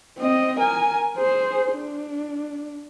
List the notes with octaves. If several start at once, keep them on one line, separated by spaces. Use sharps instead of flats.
C4 D#5
A#4 G#5
G#4 C5
D4